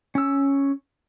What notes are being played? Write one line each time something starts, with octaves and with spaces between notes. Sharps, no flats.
C#4 E6